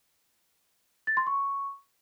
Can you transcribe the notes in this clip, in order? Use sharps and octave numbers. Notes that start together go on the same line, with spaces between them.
A6
C6
C#6